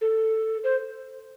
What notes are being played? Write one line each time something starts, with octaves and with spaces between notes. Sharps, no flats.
A4
C5